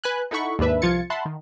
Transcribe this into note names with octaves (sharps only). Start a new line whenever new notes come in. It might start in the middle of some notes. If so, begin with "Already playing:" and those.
B4 G#5 F#6
D#4 E4 A4 F#5 B5 C#6
D#2 G#2 D4 B4 E5
C2 F3 F4 G#6 A6 C#7
E5 F#5 A5 B5 C6
D#3